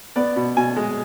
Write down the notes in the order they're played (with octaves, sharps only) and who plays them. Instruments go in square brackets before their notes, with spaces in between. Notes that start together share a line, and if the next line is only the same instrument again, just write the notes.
[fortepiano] B3 D5
B2
B2 G#5
G#3